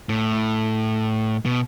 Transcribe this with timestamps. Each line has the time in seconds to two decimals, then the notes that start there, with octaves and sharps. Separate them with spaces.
0.09 A2
1.45 B2